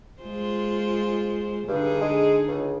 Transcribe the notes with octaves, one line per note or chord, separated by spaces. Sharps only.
G#3 F4 C5
G2 D3 D#4 G#4
G#3
C#2